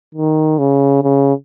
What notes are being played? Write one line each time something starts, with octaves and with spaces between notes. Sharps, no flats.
D#3
C#3
C#3